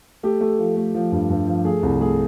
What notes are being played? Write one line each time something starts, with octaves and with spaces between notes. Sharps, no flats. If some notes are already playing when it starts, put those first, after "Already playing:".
A3 G4
A3
F3
A3
F3
G2
G2
F3
A3 G#4
C2
A3 G#4